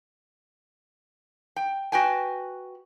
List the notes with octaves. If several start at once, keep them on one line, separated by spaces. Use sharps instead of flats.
G5
F#4 B4 G5 G#5